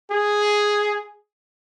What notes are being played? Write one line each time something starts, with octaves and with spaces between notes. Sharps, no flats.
G#4